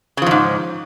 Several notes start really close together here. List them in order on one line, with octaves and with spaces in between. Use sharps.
C#3 F3 E2 G#2